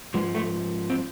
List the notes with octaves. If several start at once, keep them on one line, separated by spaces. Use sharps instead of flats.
G#2 F3 G#3
A3
C4